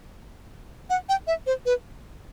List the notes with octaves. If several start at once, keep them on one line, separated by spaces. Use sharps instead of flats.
F#5
G5
E5
C5
B4